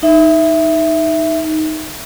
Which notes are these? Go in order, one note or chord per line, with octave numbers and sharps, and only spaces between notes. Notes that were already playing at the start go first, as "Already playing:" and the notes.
D#4 E5